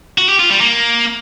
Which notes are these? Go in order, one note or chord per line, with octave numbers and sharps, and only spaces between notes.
F#4
G4
F4
G3
A#3